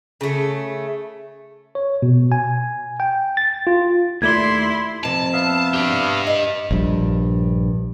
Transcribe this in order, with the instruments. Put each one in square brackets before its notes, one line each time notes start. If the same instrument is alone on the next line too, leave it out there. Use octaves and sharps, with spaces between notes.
[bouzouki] C#3 A3
[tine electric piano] C#5
B2
G#5
G5
A6
F4
[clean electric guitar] D#2 A3 D5 [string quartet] E4 C6 [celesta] G#6 G7
[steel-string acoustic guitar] F2 C3 [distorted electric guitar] A5
[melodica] B3 E5 F5
[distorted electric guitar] D4 G4
[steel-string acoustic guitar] D#5
[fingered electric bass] A#1 G2